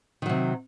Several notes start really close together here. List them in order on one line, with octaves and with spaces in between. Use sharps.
D#3 F#3 C3